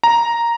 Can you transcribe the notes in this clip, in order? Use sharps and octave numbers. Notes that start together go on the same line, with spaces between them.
A#5